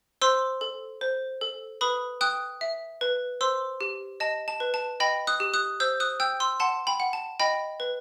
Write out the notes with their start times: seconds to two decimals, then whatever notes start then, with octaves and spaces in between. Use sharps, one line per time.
0.21 C5 C6 E6
0.61 A4
1.01 C5
1.41 A4
1.81 B4 B5 D#6
2.21 G5 D#6 F#6
2.61 E5
3.01 B4
3.41 C5 C6 E6
3.81 G4
4.20 D#5 A5
4.48 A5
4.60 B4
4.74 A5
5.00 D#5 G5 B5
5.27 D#6 F#6
5.40 G4
5.54 D#6 F#6
5.80 C5 E6 G6
6.00 D#6 F#6
6.20 G5 E6 G6
6.40 C6 E6
6.60 F#5 A5 C6
6.87 G5 B5
7.00 F#5
7.13 A5
7.40 D#5 G5 B5
7.80 B4